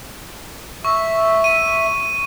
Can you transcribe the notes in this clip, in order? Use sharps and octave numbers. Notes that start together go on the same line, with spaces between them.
E5 C#6
D#7